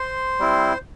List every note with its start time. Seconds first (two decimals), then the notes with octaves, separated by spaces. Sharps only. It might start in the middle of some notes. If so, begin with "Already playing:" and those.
Already playing: C5 C6
0.39 G3 C4 E4